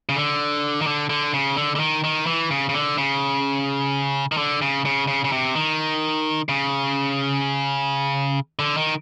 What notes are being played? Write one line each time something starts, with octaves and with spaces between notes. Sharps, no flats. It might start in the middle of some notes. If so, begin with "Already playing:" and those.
C#3
D3
D#3
D3
D3
C#3
D3
D3
D#3
D#3
E3
C#3
C#3
D3
C#3
D#3
D3
C#3
C#3
C#3
C#3
C3
D#3
C#3
D3
D#3